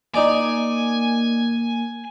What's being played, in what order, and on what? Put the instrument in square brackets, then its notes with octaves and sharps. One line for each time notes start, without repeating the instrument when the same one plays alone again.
[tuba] A#3 [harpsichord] D#4 D5 D6 [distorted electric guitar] G#5